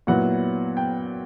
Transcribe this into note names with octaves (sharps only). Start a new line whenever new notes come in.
A#2 F#3 B3 E4 F#5
G5